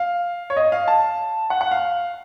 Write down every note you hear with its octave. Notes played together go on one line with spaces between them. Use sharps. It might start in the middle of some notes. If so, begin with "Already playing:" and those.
Already playing: F5
C#5
D#5
F5
A5
F#5
F#5
F5